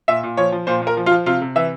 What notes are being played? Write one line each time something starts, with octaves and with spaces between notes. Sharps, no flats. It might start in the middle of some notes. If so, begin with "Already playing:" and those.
A#2 E5
A#2
F3 C#5
F3
A#2 C5
A#2
A#4
F3
F4
F3
C3 F4
C3
E3 E5